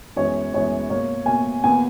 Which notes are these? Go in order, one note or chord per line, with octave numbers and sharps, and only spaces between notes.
F#2 E3 G#3 B3 C#5
F#2 E3 G#3 B3 C#5
B2 A#3 C#5
B2 A#3 G#5
E2 B2 A#3 G#5